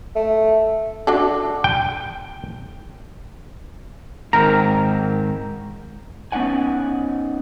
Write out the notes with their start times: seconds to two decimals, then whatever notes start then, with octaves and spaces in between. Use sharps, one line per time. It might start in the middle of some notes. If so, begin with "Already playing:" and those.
0.16 A3
1.07 D4 F#4 A4
1.64 G5
4.33 G#2 D#3 C4 A#4
6.32 B3 C#4 D#4 F#5 G#5